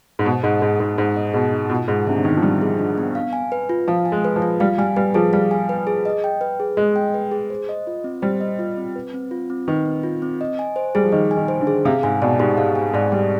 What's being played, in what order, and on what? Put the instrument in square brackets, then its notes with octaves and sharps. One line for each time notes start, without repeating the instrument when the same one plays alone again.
[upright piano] G#2
[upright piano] B2 [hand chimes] C5
[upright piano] G#2 [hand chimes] D#5
[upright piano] G#2 [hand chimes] G#4
[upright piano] G#2 [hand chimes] D#4
[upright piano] G#2 [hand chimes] C5
[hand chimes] D#5
[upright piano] B2 [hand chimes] G#4
[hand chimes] D#4
[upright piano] B2 [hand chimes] F4
[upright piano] G#2 [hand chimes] G#4
[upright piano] C3 [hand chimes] D4
[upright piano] D3
[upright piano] D#3 [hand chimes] B3
[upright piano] F3
[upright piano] G3 [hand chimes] F4
[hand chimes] G#4
D4
B3
F5
G#5
B4
F4
[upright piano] F3 [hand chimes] F5
[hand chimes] G#5
[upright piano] G#3
[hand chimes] B4
[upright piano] F3
[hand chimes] F4
[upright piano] G3 [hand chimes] F5
[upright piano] G3 [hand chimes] G#5
[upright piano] G3 [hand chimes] B4
[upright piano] F3 [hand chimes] G#4
[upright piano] G3 [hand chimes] F5
[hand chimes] G#5
B4
G#4
D#5
G5
B4
G#4
[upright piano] G#3 [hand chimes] D#5
[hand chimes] G5
B4
G#4
C5
D#5
F4
C4
[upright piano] G3 [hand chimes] C5
[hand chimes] D#5
F4
C4
B4
C4
F4
C4
[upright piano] D#3 [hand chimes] B4
[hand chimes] C4
F4
C4
D#5
G#5
C5
[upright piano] G3 [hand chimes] G#4
[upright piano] F3
[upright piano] D#3 [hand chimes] D#5
[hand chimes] G#5
[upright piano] D#3
[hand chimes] C5
[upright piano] D3
[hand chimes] G#4
[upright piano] C3 [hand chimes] F5
[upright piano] G#2 [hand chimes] G#5
[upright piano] B2 [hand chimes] D5
[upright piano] G#2 [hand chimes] G4
[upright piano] G#2 [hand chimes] F5
[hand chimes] G#5
[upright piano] G#2 [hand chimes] D5
[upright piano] G3 [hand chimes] G4